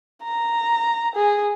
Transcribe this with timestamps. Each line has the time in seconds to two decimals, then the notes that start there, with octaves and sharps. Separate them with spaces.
0.23 A#5
1.16 G#4